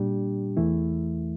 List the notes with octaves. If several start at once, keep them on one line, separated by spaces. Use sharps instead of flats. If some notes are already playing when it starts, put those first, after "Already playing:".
Already playing: A#2 G3 D4 G4
E2 E3 A3 E4